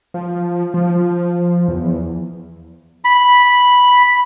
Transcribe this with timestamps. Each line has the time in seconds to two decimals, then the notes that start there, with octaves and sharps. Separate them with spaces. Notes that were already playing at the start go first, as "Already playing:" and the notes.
0.14 F3
0.74 F3
1.68 E2
3.05 B5